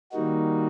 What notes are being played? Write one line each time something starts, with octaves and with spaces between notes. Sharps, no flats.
D#3 G3 A#3 D#4 F#4